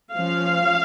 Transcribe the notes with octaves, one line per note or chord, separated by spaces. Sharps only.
F3 C#4 F5